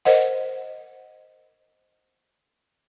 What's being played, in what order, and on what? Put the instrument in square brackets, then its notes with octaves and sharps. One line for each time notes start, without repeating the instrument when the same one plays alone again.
[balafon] A#4 C5 D#5 F#5